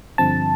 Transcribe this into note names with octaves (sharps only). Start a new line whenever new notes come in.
G2 D3 F3 C4 A5